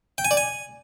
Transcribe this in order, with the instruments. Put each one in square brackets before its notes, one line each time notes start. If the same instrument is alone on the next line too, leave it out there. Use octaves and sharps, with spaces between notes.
[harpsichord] G5
G#5
D5
G#5